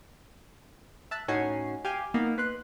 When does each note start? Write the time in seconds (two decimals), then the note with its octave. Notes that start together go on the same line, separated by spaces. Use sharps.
1.11 E5 A5 F#6
1.28 A2 C#4 D#4 F#4 G#5 C7
1.85 G4 F5 G#5
2.14 A#3 B3 D#4
2.38 B4 C6 F#6